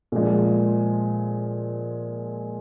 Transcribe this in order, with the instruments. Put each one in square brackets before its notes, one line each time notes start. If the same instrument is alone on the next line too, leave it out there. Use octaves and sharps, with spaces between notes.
[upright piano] A#2 F3 G#3